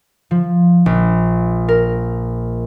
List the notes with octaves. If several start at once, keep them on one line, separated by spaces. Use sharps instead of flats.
F3
A#1
A#4